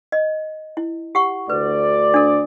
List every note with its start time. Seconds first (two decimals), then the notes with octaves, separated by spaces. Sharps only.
0.12 D#5
0.77 E4
1.15 G4 F#5 C#6
1.50 D2 B4 D5
2.14 D4 A4